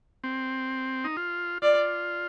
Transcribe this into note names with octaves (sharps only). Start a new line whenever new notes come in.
C4
D#4
F4
F4 D5